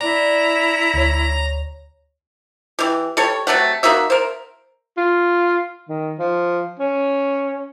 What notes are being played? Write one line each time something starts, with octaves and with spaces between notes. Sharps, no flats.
D4 E4 A#5
D2 C#5
E3 G4
G3 A4 C#5
C3 F#3 A3 F#5
A#3 D#4 F#4 E5
A#4 C5
F4
D#3
F3
C#4